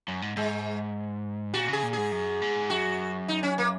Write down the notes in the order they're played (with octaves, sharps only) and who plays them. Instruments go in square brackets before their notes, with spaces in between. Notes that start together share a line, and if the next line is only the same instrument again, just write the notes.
[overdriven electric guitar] F#2
G#2
[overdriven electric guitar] G#2 [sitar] G#3
[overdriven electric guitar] A#2 [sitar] F#4
[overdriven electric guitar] C#3 [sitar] G#4
[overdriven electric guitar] A#2
[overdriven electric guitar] G#2 [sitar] G#4
[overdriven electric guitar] F#2
G#2
[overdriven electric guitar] F#2 [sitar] F#4
[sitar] D#4
C#4
A#3